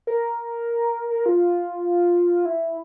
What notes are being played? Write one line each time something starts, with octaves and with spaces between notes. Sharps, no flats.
A#4
F4
E4